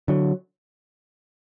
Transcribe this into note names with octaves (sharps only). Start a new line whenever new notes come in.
D3 F#3